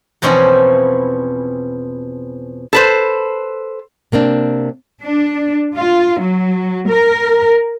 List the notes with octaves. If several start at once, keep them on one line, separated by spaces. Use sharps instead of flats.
E2 B2 F3 C4 C#4 E4
A4 B4 C5
C3 A#3 C4 D4
D4
F4
F#3
A#4